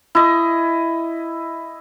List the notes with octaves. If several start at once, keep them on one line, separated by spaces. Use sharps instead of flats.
E4 D#5